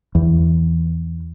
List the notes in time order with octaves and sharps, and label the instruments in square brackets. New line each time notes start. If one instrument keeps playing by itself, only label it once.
[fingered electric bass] E2